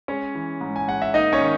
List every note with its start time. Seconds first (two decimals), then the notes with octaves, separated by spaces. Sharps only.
0.08 G#3 C#4 C#5
0.35 E3
0.61 G#2
0.76 G#5
0.88 G#2 F#5
1.02 E5
1.14 A#3 D#4 D#5
1.33 C#4 C#5
1.41 D#3